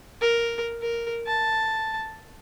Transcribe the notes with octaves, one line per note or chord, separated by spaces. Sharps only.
A#4
A#4
A5